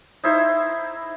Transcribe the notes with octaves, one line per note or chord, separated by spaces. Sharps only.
D#4 E4 C5